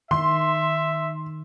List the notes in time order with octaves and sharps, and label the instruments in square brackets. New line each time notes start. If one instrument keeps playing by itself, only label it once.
[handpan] D#3 [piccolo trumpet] E5 [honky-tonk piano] C6